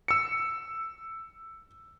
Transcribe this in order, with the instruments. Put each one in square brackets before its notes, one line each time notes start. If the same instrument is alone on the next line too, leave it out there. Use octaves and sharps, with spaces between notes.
[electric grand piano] E6 C#7